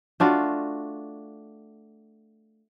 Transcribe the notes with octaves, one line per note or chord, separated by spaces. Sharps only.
A3 D4 F4 F#4